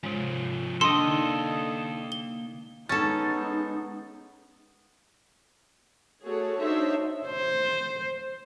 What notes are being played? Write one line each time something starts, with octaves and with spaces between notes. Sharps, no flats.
C3 F3 G#3 C#4
A#3 C#4 D4 A4 D#5 G5 C6
D3 D#4
G7
G#3 B3 C#4 D#4 A4 A6
A3 F#4 G#4 A4 C#5
D4 D#4 F#4 C5 C#5 E5
C5